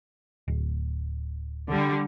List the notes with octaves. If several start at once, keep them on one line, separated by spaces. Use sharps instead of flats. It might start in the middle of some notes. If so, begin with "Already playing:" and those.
D1
D3 G3